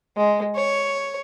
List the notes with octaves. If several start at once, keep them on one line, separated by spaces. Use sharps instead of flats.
G#3
C#5